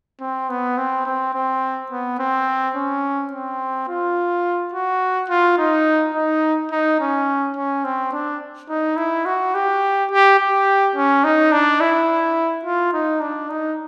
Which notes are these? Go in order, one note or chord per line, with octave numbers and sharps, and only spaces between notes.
C4
B3
C4
C4
C4
B3
C4
C#4
C4
F4
F#4
F4
D#4
D#4
D#4
C#4
C#4
C4
D4
D#4
E4
F#4
G4
G4
G4
C#4
D#4
D4
E4
F4
D#4
D4
D#4